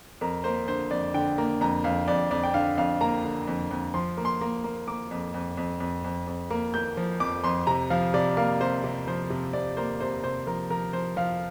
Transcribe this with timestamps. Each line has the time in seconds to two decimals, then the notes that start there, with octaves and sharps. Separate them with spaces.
0.21 F2 A#4
0.44 A#3 C5
0.68 D3 C5
0.91 F2 D5
1.14 D3 G5
1.38 A#3
1.61 F2 A#5
1.84 F2 F5
2.08 F2 D5
2.31 F2 D5
2.43 G5
2.54 D3 F5
2.77 F2 F5
3.01 A#3 A#5
3.24 D3
3.48 F2
3.71 F2
3.94 F3 C6
4.17 A#3
4.25 C6
4.41 A#3
4.64 A#3
4.88 A#3 D6
5.11 F2
5.34 F2
5.57 F2
5.80 F2
6.04 F2
6.27 F2
6.50 A#3
6.74 A#3 G6
6.97 F3
7.20 F2 D6
7.44 F2 C6
7.67 C3 A#5
7.90 F3 F5
8.14 C3 D5
8.37 A#3 F5
8.60 C3 C5
8.84 C3
9.07 F3 C5
9.30 C3
9.53 C3 D5
9.77 A#3 C5
10.00 C3 C5
10.23 C3 C5
10.47 F3 A#4
10.70 F3 A#4
10.93 F3 C5
11.17 F3 F5